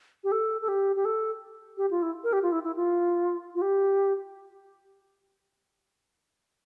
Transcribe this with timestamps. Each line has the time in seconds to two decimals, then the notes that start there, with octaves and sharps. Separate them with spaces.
0.24 G4
0.32 A4
0.61 A4
0.68 G4
0.96 G4
1.05 A4
1.78 G4
1.91 F4
2.02 E4
2.24 A#4
2.33 G4
2.43 F4
2.52 E4
2.63 E4
2.76 F4
3.55 F4
3.62 G4